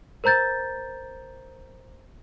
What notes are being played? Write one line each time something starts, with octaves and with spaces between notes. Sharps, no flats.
A#4 C5 A#5 G6 A6